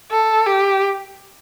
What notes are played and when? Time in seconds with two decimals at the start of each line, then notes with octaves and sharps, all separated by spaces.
0.11 A4
0.46 G4